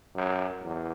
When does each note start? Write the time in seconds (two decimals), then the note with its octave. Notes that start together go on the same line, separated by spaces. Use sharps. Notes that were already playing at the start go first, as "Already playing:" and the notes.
0.16 F#2
0.63 E2